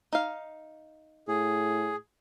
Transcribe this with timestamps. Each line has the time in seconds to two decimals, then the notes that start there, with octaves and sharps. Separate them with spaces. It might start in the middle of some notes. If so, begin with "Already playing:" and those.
0.13 D#4 F5
1.28 A2 G#4